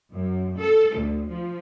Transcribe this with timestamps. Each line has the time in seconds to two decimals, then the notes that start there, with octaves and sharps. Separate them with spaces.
0.13 F#2
0.56 A4
0.95 D2
1.28 F3